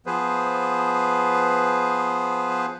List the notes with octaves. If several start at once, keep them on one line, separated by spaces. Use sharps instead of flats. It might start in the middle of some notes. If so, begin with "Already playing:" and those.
F3 B3 G#4 B4 C5